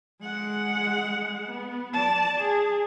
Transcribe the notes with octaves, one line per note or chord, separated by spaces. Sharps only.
G#3 F#5
B3
D5 A5
G#4